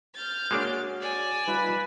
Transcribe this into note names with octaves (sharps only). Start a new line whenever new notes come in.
F6 G6 A6
G#3 A#3 D4 F#4 G#4 C#5
D5 G#5 E6
G3 D#4 F4 B4